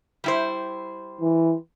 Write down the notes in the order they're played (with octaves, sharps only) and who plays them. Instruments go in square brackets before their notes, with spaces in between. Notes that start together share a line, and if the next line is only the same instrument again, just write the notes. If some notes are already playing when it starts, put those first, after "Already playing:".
[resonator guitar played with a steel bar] G3 E4 C5
[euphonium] E3